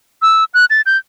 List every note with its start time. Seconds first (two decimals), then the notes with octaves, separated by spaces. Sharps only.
0.22 E6
0.54 F#6
0.70 A6
0.86 G6